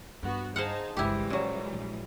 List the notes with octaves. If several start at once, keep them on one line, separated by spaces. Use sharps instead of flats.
G2 B3 F#4
D#4 G#4 C5 F5 F#5 A5
G1 C#2 E3 G3 G#3 E4 G4
A#2 F#3 C#4
A#1